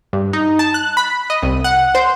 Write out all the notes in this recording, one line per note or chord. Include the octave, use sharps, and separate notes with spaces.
G2
D#4
A5
F#6
B5
D#5
C2
F#5
C5